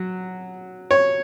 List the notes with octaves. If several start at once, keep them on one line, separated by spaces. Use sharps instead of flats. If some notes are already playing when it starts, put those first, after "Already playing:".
Already playing: F#3
C#5